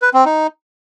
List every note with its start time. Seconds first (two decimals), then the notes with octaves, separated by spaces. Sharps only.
0.02 B4
0.14 C4
0.26 D#4